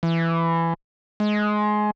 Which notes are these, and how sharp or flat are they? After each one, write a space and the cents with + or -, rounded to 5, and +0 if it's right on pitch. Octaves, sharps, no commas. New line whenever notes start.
E3 +15
G#3 +20